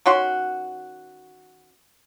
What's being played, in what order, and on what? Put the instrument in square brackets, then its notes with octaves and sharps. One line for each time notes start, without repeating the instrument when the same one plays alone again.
[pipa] D#3 C#4 F#4 C6